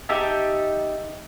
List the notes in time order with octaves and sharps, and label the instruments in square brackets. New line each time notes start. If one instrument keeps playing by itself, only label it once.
[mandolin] D#4 G4 E5 A5